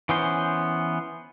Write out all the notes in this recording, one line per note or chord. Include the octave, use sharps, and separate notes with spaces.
E3 B3 C#4 C5